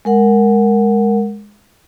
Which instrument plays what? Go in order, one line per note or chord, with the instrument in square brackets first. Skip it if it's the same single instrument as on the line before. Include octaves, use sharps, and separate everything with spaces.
[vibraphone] G#3 A#4 F#5